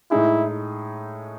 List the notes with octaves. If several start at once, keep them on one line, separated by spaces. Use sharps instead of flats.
A2 G#3 D#4 E4 G#4